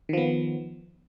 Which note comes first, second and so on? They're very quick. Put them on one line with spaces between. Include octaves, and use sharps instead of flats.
D#3 F3 B3